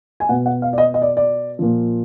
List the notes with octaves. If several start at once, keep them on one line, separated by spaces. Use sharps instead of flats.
G#5
B2 F#5
F#5
F5
D5
D#5
D#5
D5
D5
A#2 F3